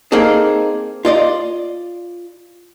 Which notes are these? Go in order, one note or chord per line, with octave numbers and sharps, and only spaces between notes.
A#3 C4 D#4 G#4 A4
F4 D5 D#5